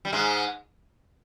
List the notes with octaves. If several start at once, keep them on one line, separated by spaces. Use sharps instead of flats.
G3
G#2 G#3